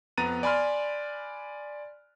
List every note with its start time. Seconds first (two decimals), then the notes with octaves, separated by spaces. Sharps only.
0.18 F2 B3 A#5 F#6 A6 D#7
0.43 D5 G#5 B5 C6 F6